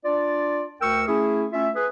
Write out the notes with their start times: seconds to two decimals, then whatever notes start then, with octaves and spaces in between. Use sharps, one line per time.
0.04 D4 F4 D5
0.81 D2 A#4 G5 C#6 E6
1.07 A3 C#4 E4 G#4
1.53 A3 C#4 F4 E5
1.75 G#4 B4